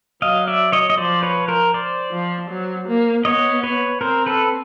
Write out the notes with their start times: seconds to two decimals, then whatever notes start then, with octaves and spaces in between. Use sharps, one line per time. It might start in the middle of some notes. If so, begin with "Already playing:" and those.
0.22 F#3 D#5 F5
0.47 D5 E5
0.72 C#5 D#5
0.90 D#5
0.98 F3 C5 D5
1.23 B4 C#5
1.48 A#4 C5
1.74 C5 D5
2.12 F3
2.50 F#3
2.87 A#3
3.25 B3 C#5 D#5
3.63 B4 C#5
4.01 C4 A#4 C5
4.26 A4 B4